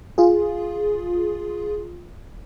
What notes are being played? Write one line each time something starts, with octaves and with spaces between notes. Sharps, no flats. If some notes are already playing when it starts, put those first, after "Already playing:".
F4 G#4